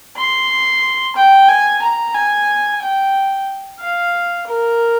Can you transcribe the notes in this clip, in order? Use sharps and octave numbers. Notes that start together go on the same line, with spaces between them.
C6
G5
G#5
A#5
G#5
G5
F5
A#4